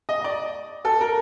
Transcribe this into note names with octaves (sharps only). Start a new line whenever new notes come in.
D#5
D5
A4
A#4